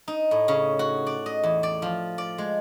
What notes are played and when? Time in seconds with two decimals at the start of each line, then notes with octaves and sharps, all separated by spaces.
0.08 D#4
0.31 A2
0.48 C#3
0.79 F#4
1.07 D5
1.26 D#5
1.43 E2
1.63 D5
1.82 F3
2.18 D5
2.38 G#3